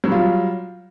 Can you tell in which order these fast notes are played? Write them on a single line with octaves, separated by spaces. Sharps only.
F#3 G3 F4